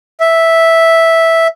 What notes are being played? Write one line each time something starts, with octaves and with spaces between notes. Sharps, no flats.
E5